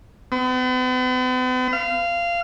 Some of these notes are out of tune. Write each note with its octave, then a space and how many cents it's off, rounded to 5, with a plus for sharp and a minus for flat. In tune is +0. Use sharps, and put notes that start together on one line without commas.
B3 +45
F5 -20